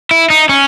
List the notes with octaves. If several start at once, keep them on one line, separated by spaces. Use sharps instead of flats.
E4
D#4
C#4